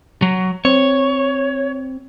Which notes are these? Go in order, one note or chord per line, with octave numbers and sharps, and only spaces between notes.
F#3
C4 C#5